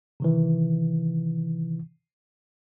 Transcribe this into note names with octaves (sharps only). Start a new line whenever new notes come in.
C3 D#3 E3